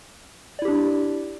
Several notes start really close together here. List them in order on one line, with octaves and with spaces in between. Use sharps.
D5 E4 G4 D4